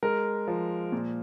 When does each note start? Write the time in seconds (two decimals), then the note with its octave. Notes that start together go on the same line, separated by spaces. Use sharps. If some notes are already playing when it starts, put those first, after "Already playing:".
0.03 G#3 A#4
0.47 F3
0.92 A#2